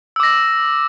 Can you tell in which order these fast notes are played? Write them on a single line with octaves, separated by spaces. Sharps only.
E6 D6 A#6